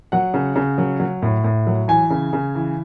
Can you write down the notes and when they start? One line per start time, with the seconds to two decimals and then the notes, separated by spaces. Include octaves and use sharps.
0.12 F#3 F#5
0.34 C#3
0.56 C#3
0.78 F#3
1.00 F#3
1.22 A2
1.44 A2
1.67 F#3
1.88 E3 G#5
2.10 C#3
2.33 C#3
2.55 E3